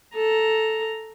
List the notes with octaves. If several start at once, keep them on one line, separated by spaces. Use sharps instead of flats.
A4 A#5